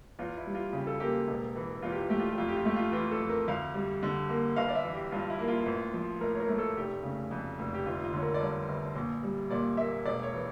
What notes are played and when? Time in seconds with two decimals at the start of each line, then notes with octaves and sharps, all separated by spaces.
0.19 E2 F4
0.37 E4
0.46 G3
0.55 F4
0.73 C#3 G4
0.87 A4
1.00 A#3 G4
1.28 E1
1.56 E3
1.82 E2 F4
1.92 G4
2.01 F4
2.10 A3 G4
2.20 F4
2.29 G4
2.38 F2 F4
2.48 G4
2.57 F4
2.65 A3 G4
2.76 F4
2.92 E3 F4
3.11 A4
3.21 F2
3.29 A#4
3.48 D2 F5
3.74 G3
4.03 D3
4.29 A#3
4.56 G1 F5
4.68 D5
4.75 E5
4.84 E3
4.93 G4
5.12 G2 F4
5.30 E4
5.39 A#3
5.48 F4
5.66 A1
5.93 F3
6.21 A2 A#4
6.34 C#5
6.40 A#4
6.49 A3
6.58 A4
6.77 F1 G4
7.03 C#3
7.31 F2
7.59 F1
7.74 G4
7.86 G1 F4
8.04 F4
8.13 D3 C#5
8.22 A#4
8.34 D5
8.40 G2 C#5
8.69 G1
8.96 A#1
9.23 G3
9.51 A#2 D5
9.77 A#3 E5
10.06 E1 D5
10.23 C#5
10.33 E3